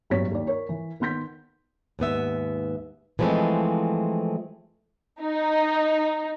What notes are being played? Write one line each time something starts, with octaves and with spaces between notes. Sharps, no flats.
A1 G2 F#3 B3 C#5 B6
D#2 D5
A#4 C#5
E3
D#3 B3 C6 G6 B6
D#2 G#2 B3 E5
E3 F3 G#3 A3 C4
D#4